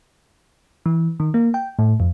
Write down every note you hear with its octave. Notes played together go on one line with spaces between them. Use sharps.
E3
D#3
A#3
G5
A2
F2